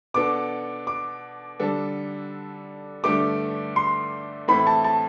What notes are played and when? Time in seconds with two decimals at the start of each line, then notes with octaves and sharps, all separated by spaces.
0.14 B2 B3 D4 A4 D6
0.87 D6
1.59 D3 G3 D4 A4
3.04 G2 D3 A3 D4 G4 D6
3.76 C6
4.48 A2 E3 A3 C4 E4 B5
4.67 A5
4.84 A5